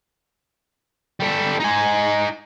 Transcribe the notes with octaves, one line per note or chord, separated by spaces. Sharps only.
G3 A4
D#4 G#5